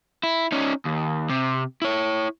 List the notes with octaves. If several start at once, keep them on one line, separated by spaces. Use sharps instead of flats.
E4
C#4 D#4
D#2
C3
E4 C#5